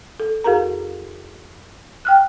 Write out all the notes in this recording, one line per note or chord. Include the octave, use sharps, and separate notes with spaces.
A4
F2 F#4 G#4 A#4 A#5
G5 F6 F#6